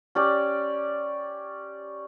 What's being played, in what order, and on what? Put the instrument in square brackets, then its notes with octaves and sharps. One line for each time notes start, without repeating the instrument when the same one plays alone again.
[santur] C#4 G4 D5